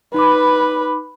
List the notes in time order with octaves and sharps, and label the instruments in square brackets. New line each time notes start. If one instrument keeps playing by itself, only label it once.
[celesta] D#4 B5 D6 [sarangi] B4